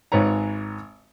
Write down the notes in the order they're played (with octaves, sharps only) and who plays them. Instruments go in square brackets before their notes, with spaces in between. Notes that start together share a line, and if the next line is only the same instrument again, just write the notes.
[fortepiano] G#1 G#2 B4 C#5 A#5